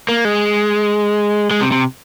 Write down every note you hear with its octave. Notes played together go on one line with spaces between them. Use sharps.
A#3
G#3
G#3
C3
C3